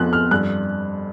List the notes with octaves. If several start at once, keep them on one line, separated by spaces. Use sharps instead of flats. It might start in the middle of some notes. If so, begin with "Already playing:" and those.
Already playing: F2 B3 F#6
F6
G2 F#6